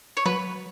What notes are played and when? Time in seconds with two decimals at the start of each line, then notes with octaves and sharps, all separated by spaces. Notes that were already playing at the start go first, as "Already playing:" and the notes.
0.17 C#5
0.26 F#3 B4